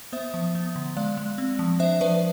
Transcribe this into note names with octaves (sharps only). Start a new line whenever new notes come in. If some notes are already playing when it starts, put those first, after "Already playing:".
B3 C5 E5
F3
B3
D3
G#3 D5 F5
G#3
C4
F3
D4 C5 E5
F3 B4 D5